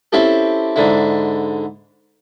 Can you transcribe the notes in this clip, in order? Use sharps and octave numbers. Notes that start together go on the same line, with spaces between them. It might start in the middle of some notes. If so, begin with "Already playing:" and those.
C4 C#4 E4 G4 A4
G#2 D3 E4